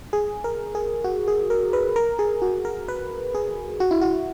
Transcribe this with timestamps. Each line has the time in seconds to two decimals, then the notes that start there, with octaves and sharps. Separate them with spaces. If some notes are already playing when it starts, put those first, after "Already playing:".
0.13 G#4
0.44 A#4
0.75 G#4
1.04 F#4
1.28 G#4
1.50 A#4
1.73 B4
1.96 A#4
2.19 G#4
2.42 F#4
2.65 A#4
2.88 B4
3.35 G#4
3.80 F#4
3.91 E4
4.01 F#4